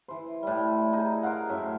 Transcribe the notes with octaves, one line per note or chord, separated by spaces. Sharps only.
E3 C5
A2 G3
D#4 G#4
A#4 C5 F5 F#5
F#2 A2 E5